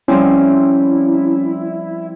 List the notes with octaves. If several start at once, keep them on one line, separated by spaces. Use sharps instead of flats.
F3 G3 C4 C#4 E4